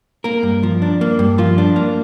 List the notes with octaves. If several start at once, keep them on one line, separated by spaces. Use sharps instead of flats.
A#3 A#4
G2
F3
D4
A#3
G2
F3 F4
D4
A#3